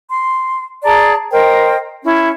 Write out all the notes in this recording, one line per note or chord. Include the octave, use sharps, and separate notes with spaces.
C6
G#4 D5 A5 A#5
A#4 C5 D#5 G5
C#4 E4